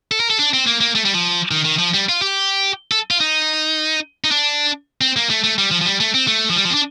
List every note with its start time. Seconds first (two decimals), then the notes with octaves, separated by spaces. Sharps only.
0.11 A4
0.20 A#4
0.30 A4
0.39 D4
0.53 C4
0.67 A#3
0.81 A#3
0.95 A3
1.05 G3
1.14 F3
1.51 D#3
1.65 D#3
1.79 F3
1.94 G3
2.09 F4
2.22 G4
2.91 A4
3.11 F4
3.20 D#4
4.24 D#4
4.31 D4
5.01 C4
5.16 A#3
5.30 A3
5.44 A3
5.58 G3
5.71 F3
5.81 F3
5.86 G3
6.00 A3
6.14 C4
6.27 A3
6.50 F3
6.56 G3
6.65 F3
6.70 C4
6.74 D4